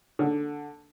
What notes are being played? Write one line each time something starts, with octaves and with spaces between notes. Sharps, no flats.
D3